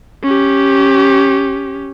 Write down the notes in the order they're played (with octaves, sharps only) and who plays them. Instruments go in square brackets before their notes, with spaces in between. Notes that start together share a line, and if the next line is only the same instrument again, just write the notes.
[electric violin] C#4 G4